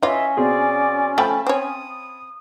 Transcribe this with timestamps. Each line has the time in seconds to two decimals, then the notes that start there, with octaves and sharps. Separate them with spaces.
0.03 E3 C#4 F4 C#5 D#5 E5
0.37 B2 C4 G#4 D5
1.18 F3 A3 F5 G5 A5 B5
1.47 C4 C#5 D#6